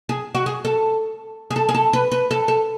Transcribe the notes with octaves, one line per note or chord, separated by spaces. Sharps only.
G#4
F#4
G#4
A4
G#4
A4
G#4
A4
B4
B4
A4
A4